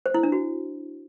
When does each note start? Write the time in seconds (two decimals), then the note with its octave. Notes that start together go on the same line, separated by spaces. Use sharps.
0.06 C5
0.14 E4
0.23 D4
0.32 F#4